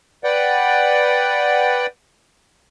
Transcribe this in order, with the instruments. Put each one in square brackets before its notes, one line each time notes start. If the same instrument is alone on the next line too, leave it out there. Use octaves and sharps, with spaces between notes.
[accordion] B4 D5 F#5 G5